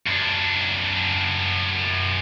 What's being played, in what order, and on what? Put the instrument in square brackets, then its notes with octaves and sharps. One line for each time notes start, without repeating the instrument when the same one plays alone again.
[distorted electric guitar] F#2 D4